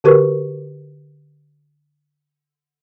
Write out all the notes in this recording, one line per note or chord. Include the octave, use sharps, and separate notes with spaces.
D3 F#4 G4 A#4 B4 C#6